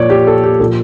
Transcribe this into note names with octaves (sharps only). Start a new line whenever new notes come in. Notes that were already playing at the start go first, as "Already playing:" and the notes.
Already playing: A#2 F3 C#5 D5
G4
A4
G4
A#2 F3 A4